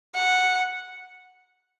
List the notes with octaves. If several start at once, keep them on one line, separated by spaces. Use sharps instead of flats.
F#5